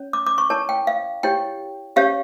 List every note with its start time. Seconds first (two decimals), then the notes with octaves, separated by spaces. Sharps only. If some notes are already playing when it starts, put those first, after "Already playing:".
Already playing: C#4 C#5
0.13 D6
0.26 D6
0.38 C#6
0.50 E4 A#4 C#5 A5
0.69 G5
0.87 F5
1.23 E4 G4 C#5 G5
1.96 C#4 G4 C#5 F5